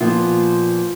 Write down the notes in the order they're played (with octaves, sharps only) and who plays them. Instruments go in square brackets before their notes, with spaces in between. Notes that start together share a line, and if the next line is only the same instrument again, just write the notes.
[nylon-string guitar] A#2 F3 B3 F4